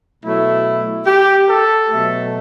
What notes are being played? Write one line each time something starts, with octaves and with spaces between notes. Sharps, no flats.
B2 F#3 A3 E4
G4
A4
B2 F#3 A3